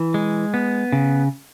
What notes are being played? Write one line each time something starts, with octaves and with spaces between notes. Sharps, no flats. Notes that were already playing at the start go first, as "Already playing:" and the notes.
Already playing: E3
G#3
B3
C#3